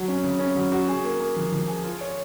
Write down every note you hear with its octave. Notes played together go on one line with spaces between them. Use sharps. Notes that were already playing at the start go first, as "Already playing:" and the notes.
Already playing: F#3
C#4
C#3
C#4
F#3
F#4
G#4
A#3
A#3
F3
F3
G#4
F4
C#5